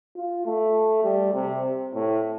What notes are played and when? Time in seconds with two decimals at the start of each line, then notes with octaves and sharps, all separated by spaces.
0.16 F4
0.46 A3
1.04 G3
1.34 C3
1.94 A2